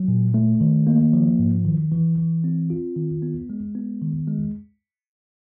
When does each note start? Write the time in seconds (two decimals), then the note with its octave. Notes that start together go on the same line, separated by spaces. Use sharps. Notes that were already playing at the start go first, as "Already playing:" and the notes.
Already playing: F#3
0.08 A#2
0.34 A3
0.61 D#3
0.87 A#3
1.13 F3
1.39 G#2
1.65 D#3
1.92 E3
2.18 E3
2.44 C4
2.70 F4
2.96 D#3
3.22 B3
3.50 G#3
3.75 B3
4.01 D#3
4.28 G#3